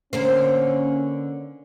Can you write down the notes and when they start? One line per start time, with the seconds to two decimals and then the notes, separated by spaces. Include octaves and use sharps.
0.13 D3 A#3 C#4 C5